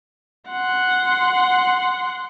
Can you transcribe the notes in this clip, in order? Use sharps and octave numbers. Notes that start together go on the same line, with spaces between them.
F#5 C6